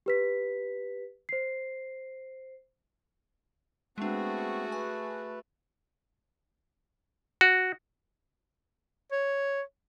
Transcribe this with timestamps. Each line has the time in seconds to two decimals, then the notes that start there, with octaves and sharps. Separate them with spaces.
0.06 G4 B4 B6
1.29 C5 C7
3.98 G#3 A3 B3 C4 D4 F#4 G#4
4.72 B4 G#5
7.41 F#4
9.12 C#5